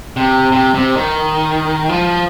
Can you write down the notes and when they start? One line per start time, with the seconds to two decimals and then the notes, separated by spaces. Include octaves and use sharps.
0.17 C3
0.52 C3
0.74 C3
0.97 D#3
1.89 F3